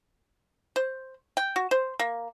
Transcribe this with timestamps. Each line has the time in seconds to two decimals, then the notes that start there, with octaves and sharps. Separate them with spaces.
0.76 C5
1.37 G5
1.56 F#4
1.71 C5
1.99 A#3